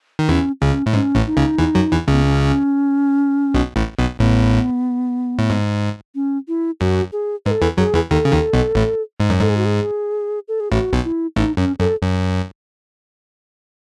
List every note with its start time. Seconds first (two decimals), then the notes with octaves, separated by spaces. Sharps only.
0.19 D#3
0.29 E2 E3 C#4
0.61 C#2 C#3 C#4
0.86 A2
0.93 G#2 C#4
1.15 A1 A2
1.27 D#4
1.37 C#2 C#3
1.59 E2 E3
1.75 F#2 F#3
1.91 E2 E3
2.08 C#2 C#3 B3
2.24 C#4
3.54 B1 B2
3.76 A1 A2
3.99 B1 B2
4.19 A1 A2 B3
5.39 A2
5.50 G#2
6.15 C#4
6.48 E4
6.80 F#2 F#4
7.12 G#4
7.46 G#2 B4
7.51 A4
7.62 E2 E3
7.77 F#2 F#3 G#4
7.94 E2 E3
8.11 D#2 D#3 A4
8.25 C#3
8.32 D#2 D#3
8.53 B1 B2
8.75 A1 A2
9.20 G#2
9.30 F#2
9.41 G#2 A4
9.50 G#4
9.57 F#4
9.66 G#4
10.48 A4
10.60 G#4
10.71 A1 A2 F#4
10.93 B1 B2
11.04 E4
11.36 A1 A2 D#4
11.57 F#2 C#4
11.79 F#2 A4
12.02 F#2